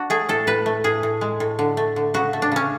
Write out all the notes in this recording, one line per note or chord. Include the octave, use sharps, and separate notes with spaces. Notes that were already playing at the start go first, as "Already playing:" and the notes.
Already playing: D4 F#4
A3 G#4
A2 A4
A2 B4
A3
A2 G#4
A2
G#3
A2
D3
A3
D3
C#3 F#4
A3
D4
C#3 C#4